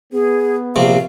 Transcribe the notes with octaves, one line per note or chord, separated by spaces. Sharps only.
B3 G#4
A#1 C3 F5